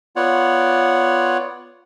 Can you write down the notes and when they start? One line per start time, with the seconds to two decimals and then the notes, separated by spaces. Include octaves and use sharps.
0.16 B3 F4 C#5 D5 F#5